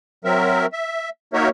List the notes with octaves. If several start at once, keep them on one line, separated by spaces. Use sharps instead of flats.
F#3 C4 A#4 E5
E5
A#3 D#4 F#4 A#4 C#5 E5